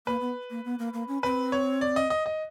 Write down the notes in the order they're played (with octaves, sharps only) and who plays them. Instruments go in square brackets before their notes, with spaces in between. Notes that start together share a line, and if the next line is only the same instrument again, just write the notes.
[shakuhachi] A#3 [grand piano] B4
[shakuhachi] B3
A#3
B3
A#3
A#3
C#4
[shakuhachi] C4 [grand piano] B4
[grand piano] C#5
D5
D#5
D#5
D#5